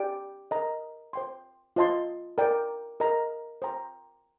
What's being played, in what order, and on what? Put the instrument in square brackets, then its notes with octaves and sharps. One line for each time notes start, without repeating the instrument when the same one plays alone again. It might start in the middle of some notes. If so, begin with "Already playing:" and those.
Already playing: [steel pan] G4 D5 G5
A#4 D#5 A#5
C5 G5 C6
F4 C5 D#5 A5 C6
A#4 D5 G5
A#4 D#5 A#5
C5 G5 A#5